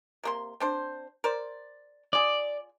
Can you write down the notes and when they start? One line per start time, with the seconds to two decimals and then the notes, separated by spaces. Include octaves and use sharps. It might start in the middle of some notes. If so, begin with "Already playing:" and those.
0.24 C3 A#3 C6
0.60 C4 D4 C5
1.24 A#4 C5 D5
2.13 F4 G#4 D5